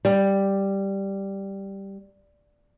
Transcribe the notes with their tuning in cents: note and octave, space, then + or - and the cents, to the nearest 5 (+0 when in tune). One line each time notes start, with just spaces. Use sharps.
G3 +0